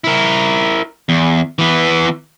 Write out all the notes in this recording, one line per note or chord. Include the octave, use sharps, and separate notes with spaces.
E4 A#4
E2
E3 B3